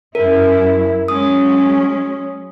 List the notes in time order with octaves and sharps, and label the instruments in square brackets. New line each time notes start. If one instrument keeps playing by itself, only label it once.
[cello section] F#2 E4 [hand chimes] A#4
[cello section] F#3 G#3 C#4 [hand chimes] D#6